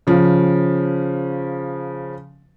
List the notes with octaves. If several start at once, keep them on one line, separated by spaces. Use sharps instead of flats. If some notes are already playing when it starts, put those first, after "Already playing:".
C#3 F3